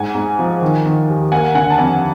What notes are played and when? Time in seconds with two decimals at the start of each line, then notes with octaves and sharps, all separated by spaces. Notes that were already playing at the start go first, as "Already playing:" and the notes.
Already playing: G#2 F#5 G#5
0.15 G#2
0.39 F3
0.62 D#3
0.86 D#3
1.09 D#2
1.32 A#3 F#5 G#5
1.55 D3 F#5 G#5
1.70 A5
1.78 F2 F#5 G#5